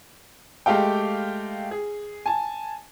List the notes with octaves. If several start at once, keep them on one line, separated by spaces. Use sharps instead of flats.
G#3 A3 G4 F5 G5
G#4
G#5 A5